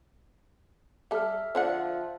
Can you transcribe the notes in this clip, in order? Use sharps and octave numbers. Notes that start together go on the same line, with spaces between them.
G3 A4 E5 F6
D3 F3 D4 F#5